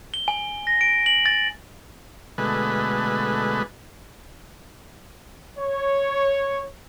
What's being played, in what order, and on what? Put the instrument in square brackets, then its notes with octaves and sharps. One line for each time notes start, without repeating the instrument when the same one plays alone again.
[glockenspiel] G7
G#5
A#6
D7
F#7
A6
[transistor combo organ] B2 D3 G#3 A3 B4
[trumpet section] C#5